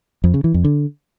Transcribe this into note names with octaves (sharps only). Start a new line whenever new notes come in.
F2
C#3
E3
F2
D3